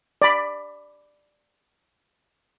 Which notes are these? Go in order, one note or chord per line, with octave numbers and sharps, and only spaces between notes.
D5 B5